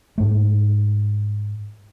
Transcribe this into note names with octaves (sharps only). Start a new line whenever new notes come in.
G#2 A3